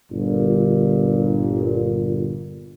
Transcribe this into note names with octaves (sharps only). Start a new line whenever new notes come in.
G1 A#2